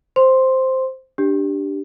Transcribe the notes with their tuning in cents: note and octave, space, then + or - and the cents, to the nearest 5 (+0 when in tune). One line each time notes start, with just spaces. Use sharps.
C5 +0 C6 +0
D4 +0 G4 +0